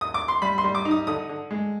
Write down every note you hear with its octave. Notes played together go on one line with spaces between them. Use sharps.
D#6
D6
C6
G3 B5
C6
G3
D6
D#4
D#6
D3 D#6
D3
G#3